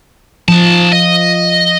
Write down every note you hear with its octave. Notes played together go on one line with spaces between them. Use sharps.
F3 D#4 A5
D#5